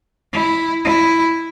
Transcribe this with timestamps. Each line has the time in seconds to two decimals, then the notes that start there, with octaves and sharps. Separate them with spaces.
0.32 E4
0.85 E4